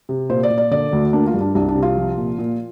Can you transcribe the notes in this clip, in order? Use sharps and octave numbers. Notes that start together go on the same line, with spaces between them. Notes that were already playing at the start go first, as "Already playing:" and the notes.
C3
A#2 C5
D5
A#2
D5
D3 D5
D2
A#3 D4
F4
G2
D4
C2 D4
D4
C3
F4
F3
A#2
A#2